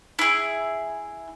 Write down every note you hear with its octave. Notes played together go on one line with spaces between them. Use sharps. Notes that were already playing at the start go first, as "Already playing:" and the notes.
E4 G#4